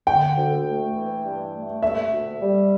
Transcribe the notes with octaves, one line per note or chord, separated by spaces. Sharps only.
D3 G5
D2
A3
E3
G2
A3
D3 E5
D2
G3